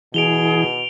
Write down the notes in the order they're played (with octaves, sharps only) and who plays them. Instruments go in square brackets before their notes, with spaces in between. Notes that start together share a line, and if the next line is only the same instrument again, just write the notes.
[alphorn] B2 [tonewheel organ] E3 [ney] G#4 [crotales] D7 F7 G7